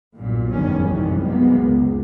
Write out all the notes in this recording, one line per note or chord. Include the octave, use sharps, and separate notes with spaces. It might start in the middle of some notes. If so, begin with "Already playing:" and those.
B1 G2 A#2
F#1 E2 G2 D#3 G3 C#4
A#1 F#2 C3 D#3 E3 G3
B1 G#3 A#3 B3
C#2